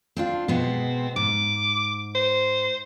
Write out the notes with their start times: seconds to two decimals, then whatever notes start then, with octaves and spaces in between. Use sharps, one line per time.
0.16 C4 D4 F4
0.48 B2 G#3 B3 C4
1.16 G#2 D6
2.15 C5